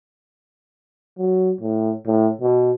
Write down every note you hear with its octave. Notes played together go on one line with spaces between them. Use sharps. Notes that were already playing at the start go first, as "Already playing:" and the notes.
F#3
A2
A2
B2